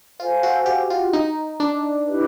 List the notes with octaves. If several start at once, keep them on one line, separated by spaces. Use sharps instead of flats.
F4 A4 C5 F5 G#5
F#4
G4
F4
D#4
D4
E4 G4 B4